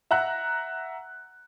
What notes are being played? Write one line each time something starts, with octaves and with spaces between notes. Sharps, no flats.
E5 F#5 A#5 F#6